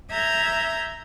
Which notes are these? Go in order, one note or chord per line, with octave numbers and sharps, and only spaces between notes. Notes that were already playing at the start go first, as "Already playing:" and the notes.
E5 A#5 G6 G#6